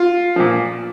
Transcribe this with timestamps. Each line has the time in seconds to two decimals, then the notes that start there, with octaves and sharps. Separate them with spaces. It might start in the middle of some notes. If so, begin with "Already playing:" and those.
Already playing: F4
0.36 A#2 F3